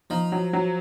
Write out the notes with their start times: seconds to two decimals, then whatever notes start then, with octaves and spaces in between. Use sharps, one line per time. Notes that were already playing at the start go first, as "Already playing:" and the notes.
0.10 F3 D#4
0.32 F#3
0.53 F#3